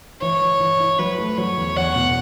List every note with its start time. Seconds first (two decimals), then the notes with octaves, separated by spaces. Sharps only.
0.21 E3 C#5
0.41 E3
0.60 E3
0.80 E4
0.98 F#3 B4
1.18 A3
1.38 F#3 C#5
1.57 E2
1.77 E2 F#5
1.96 B2